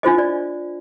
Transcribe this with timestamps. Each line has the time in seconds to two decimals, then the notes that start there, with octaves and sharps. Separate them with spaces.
0.03 D4 F4 C5 D#5
0.18 D5